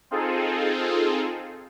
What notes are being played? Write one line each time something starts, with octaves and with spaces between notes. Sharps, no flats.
C4 D#4 F4 G#4 A4